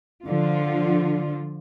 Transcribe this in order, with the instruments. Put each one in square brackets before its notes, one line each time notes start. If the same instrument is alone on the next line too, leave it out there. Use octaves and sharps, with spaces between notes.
[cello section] D3 F3 F4